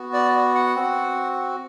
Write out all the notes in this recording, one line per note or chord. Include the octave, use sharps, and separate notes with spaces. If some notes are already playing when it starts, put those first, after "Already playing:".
Already playing: B3 F#4
D5
F#5
C4 F#4